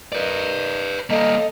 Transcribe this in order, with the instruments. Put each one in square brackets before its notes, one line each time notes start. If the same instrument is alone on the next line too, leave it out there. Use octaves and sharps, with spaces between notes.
[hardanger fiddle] A#4 D#5 [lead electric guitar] B4 D5
[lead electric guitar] G3 A#3 [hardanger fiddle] A4 F5 [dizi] D#5